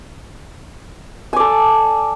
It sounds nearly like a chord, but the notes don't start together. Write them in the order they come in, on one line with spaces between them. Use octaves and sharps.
G#5 D5 A4